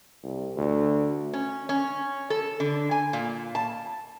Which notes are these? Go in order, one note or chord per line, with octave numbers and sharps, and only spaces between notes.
C2
D2
C#4
C#4
A4
D3
G#5
A#2
A5